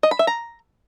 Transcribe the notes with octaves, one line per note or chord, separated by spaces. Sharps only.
D#5
B5
E5
A#5